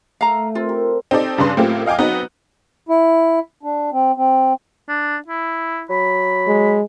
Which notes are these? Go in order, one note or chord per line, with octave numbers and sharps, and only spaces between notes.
A3 E4 F5 A#5
C4 F4 A#4
E4 G4 A#4
C4 D#4 G4 A4 D5
G2 C#3 D4 B4 C6
A2 A#3 C4 F4 G4
D#5 F5 G5 G#5 D6
F#3 B3 C4 D#4
E4
D4
C4
C4
D4
E4
F#3 B5
G#3